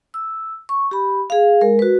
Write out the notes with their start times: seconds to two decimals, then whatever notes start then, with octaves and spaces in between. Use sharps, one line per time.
0.14 E6
0.69 C#6
0.91 G4 B5
1.30 G#4 F5
1.61 G#3 A#4
1.79 F#4 B4